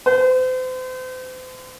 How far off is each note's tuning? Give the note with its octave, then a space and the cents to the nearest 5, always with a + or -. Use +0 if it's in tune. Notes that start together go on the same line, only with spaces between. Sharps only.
C5 -40